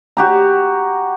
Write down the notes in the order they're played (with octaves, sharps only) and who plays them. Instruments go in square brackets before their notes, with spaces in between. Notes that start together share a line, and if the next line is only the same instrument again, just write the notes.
[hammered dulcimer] F#4 G4 A#5